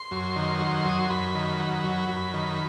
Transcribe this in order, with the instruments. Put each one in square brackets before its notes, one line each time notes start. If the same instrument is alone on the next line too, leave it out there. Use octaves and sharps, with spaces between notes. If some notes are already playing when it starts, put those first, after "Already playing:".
Already playing: [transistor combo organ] C6
F#2
D#3
F#3
F#2 D#6
C6
F#2 B5
D#3
F#3
F#2
F#2
D#3